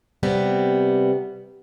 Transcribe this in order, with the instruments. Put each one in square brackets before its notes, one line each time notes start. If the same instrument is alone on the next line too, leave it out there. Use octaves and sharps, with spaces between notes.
[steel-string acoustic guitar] C3 G3 B3